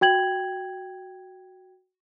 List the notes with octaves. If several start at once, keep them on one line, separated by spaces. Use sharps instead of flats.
F#4 G5 G#6 F#7